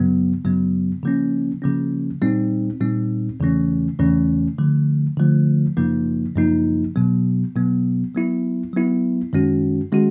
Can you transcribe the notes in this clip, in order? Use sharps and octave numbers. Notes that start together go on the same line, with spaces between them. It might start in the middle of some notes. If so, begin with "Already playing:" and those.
Already playing: F#2 C#3 F#3 B3
F#2 C#3 F#3 B3
C#3 F3 A#3 C#4
C#3 F3 A#3 C#4
A#2 G3 C4 D#4
A#2 G3 C4 D#4
E2 C#3 E3 A3 C#4
E2 C#3 E3 A3 C#4
D3 F3 A3
D3 F3 A3
F#2 C#3 F3 A#3 D#4
F#2 C#3 F3 A#3 D#4
B2 F#3 B3
B2 F#3 B3
F#3 B3 E4
F#3 B3 E4
F#2 D#3 G#3 C#4 F#4
D#3 G#3 C#4 F#4